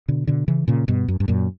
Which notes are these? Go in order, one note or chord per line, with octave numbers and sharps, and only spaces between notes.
B2 D3
B2 D3
C#3 E3
A#2 C#3
G2 B2
F#2
G2
F#2 A#2